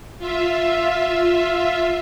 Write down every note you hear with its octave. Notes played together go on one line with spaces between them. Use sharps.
F4 E5